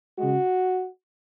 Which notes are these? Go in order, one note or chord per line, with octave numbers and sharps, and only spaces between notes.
G#3 F#4
C#3